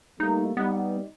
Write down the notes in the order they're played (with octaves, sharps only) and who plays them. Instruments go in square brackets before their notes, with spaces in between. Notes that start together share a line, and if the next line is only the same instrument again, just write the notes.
[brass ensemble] G3 A3 A#3 [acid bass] D#4
[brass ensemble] G3 D#4 [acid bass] B3